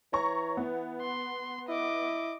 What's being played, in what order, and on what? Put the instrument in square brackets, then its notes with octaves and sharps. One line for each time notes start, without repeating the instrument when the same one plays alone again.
[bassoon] E3 [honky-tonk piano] C#5 A#5 C#6
[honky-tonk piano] B3
[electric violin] C6
[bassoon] E4 [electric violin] D#5 D6